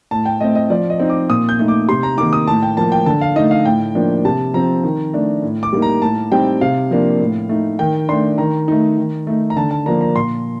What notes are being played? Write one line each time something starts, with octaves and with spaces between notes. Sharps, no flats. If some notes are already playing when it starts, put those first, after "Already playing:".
A2 A5
G5
A3 C4 D#5
D#5
F3 D5
D#5
C4 D#4
D6
A#2 D#6
G6
A3 D#4
D6
C3 C6
A#5
D#3 A#3 D#4 D6
D#6
A2 A5
G5
F3 A#3 A5
G5
D3 A5
F5
A3 D#4 D#5
F5
A2 G5
F3 A#3 D4
C3 A5
F3 C4 A#5
D#3
A3 D4
A2
D6
G3 A#3 D#4
A#5
A2 A5
G3 C4 D#4 G5
C3 F5
F3 A#3 D4
A2
A3 D#4
D#3 G5
A3 D4 C6
D#3 A#5
A3 D#4
D#3
A3 D#4
A#5
D3 A5
A5
F3 A#3 D4 A#5
A#5
A#2 C6